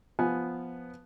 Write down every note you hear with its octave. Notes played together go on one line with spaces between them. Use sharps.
F3 B3 G#5